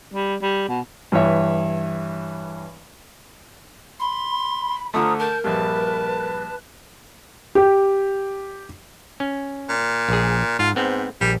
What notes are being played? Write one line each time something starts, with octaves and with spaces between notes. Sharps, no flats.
G3
G3
B2
G2 E3 C#5 E5
B5 C6
D3 A3 F4 C5 A#5 D#6
A#4 A5 G6
A#1 G2 B4 A5 F#6
G4
C#4
A#2
A#1 G#4
G#2 F4
G#2 B3 C4
A#1 G3